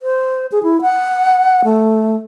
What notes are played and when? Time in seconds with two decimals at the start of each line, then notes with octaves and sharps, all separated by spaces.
0.01 C5
0.52 G#4
0.63 E4
0.82 F#5
1.65 A3